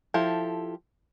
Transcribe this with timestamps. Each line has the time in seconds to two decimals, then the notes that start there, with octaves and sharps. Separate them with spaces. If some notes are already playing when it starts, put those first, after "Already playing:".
0.14 F3 E4 G4 A4